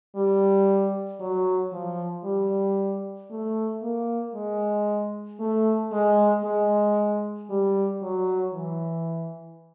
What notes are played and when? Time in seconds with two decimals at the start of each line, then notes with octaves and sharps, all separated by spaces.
0.16 G3
1.20 F#3
1.72 F3
2.24 G3
3.30 A3
3.82 A#3
4.34 G#3
5.40 A3
5.92 G#3
6.44 G#3
7.50 G3
8.02 F#3
8.54 E3